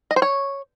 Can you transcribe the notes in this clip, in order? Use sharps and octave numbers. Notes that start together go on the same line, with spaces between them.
D#5
C5
C#5